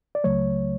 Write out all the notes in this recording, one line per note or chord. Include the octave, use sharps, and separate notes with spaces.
D5
C#2 C#3 F#3 A3 C#5